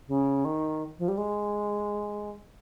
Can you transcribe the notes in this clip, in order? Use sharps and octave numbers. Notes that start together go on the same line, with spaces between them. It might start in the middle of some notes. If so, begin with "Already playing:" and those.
C#3
D#3
F3
G3
G#3